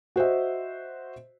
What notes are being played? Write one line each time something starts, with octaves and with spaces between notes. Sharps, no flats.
F#4 C5 D#5 E5